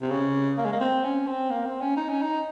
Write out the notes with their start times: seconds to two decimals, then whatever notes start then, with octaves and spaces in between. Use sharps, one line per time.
0.02 C3
0.11 C#3
0.58 A#3
0.65 G#3
0.73 A#3
0.80 C4
1.04 C#4
1.27 C4
1.50 A#3
1.66 C4
1.81 C#4
1.97 D#4
2.10 C#4
2.22 D#4